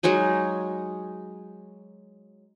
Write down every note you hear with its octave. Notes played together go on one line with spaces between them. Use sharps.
F#3 G#3 D#4 G#4